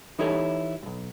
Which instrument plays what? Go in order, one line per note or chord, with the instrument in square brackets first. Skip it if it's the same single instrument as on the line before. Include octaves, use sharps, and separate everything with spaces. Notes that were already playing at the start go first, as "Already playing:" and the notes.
[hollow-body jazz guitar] E3 D#4 E4 G4 A4 C#5
B1 G2